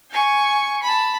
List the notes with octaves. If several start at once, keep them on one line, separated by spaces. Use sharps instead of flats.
G#5 C#6
A5 B5